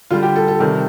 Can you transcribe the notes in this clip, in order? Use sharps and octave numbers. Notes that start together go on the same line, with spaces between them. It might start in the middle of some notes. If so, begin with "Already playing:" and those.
D3 G3 F4
G4
A4
A4
C3 D#3 G3